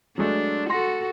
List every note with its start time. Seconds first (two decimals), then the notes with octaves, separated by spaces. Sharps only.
0.18 F#3 G#3 A3 D4
0.70 F#4 A4 C6 A#6